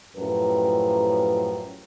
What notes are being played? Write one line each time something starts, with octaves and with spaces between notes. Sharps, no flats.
F#2 A2 F3 G4 A#4 B4